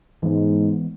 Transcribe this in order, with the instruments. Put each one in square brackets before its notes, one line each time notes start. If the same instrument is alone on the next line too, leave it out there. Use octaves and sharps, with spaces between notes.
[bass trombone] G#2 [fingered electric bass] E3 G#3 B3